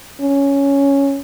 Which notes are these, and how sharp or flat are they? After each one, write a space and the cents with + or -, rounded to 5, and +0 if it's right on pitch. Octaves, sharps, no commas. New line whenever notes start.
C#4 +5